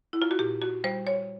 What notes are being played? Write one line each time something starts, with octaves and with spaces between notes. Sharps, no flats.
E4
F4
F#4
A#2 G4
F#4
G3 C5
C#5